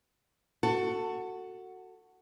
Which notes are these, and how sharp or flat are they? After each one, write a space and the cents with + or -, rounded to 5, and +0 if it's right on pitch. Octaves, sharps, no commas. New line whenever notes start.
F#4 +0 A4 +25